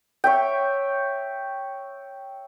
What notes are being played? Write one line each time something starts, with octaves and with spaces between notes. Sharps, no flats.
C#5 E5 G5